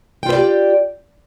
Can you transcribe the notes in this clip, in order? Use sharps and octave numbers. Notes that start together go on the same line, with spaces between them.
F4 G4 B4 D5 G5